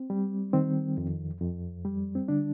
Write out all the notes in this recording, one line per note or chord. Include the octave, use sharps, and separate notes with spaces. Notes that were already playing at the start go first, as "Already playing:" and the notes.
Already playing: C4
G3
D#3 C4
F2
F2
G3
C4
D3 D4